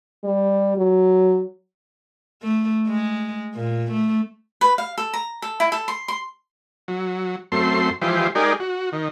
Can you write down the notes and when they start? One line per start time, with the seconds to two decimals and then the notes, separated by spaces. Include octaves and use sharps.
0.24 G3
0.77 F#3
2.42 A3
2.87 G#3
3.54 A#2
3.91 A3
4.61 B4
4.78 F5
4.98 A4
5.13 A#5
5.42 A4
5.60 E4
5.72 A4
5.88 C6
6.08 C6
6.88 F#3
7.52 F#2 A3 C4 C6
8.01 E3 F3 G#3 G4 C5
8.35 G#3 D#4 G4 G#4 A#4 D5
8.60 F#4
8.92 D#3